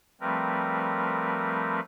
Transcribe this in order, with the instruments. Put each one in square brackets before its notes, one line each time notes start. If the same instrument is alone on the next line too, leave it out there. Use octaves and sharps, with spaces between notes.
[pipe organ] F3 G3 A3 C4 A#4 B4